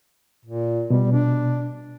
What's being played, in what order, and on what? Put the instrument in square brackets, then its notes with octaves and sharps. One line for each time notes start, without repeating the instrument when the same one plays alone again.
[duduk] A#2
[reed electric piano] B2 [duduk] G3
[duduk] D4